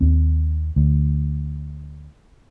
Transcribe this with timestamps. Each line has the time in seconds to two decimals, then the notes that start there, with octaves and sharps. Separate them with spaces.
0.01 D#2 C4
0.76 D2